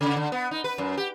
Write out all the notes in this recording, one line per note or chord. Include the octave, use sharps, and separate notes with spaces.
C#3
D3
B3
D#4
B4
F#2
G4